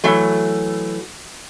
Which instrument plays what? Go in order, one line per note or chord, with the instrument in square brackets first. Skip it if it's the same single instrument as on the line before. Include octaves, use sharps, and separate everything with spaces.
[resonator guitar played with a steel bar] E3 F#3 A3